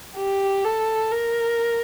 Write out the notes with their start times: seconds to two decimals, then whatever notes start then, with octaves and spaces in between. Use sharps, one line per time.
0.17 G4
0.65 A4
1.12 A#4